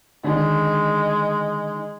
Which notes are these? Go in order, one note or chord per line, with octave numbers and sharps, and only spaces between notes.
D3 D#3 G#3